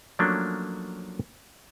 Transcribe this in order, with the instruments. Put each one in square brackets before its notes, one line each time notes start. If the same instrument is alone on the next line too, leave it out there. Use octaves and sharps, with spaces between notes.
[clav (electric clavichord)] F3 F#3 A3 A#3 C#4 D4